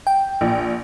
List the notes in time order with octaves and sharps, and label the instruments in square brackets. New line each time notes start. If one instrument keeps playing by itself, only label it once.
[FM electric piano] G5
[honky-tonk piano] A#1